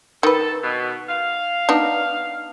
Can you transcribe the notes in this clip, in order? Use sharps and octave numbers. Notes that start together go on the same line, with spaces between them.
D#3 A4 B4
B2
F5
B3 D4 D#4